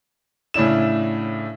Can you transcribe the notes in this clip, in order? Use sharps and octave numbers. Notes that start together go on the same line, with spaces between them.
A2 C#3 D4 E4 E7